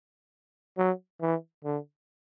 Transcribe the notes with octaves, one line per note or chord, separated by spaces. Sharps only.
F#3
E3
D3